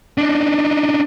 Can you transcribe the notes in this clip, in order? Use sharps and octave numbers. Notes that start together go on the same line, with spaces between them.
D4 D#4